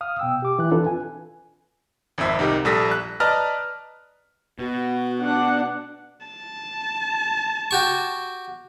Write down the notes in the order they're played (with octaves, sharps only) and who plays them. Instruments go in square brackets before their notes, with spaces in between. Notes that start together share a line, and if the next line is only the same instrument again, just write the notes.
[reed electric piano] F5 D#6 F6
B2 G5 E6
G4 D6
E3 F#6
C4 D4 F4 A4 B4
G#5
[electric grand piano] G#1 F2 C4 E5
C2 D#4 G4 A#4
A#1 G3 A4 D#6 A#6 B6
F#6
B4 D5 D#5 A5 A#5 F6
[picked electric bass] B2 [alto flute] F#4
[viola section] D4 F#5
[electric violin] A5
[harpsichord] F#4 G4 C#6